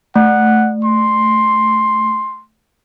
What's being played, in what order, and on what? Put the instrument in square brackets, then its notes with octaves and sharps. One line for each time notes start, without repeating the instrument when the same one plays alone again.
[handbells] A3 [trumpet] F#5
[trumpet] C6